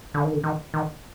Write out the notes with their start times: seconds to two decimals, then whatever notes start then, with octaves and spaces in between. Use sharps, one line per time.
0.14 D3
0.25 D#3
0.33 D3
0.44 D#3
0.74 D#3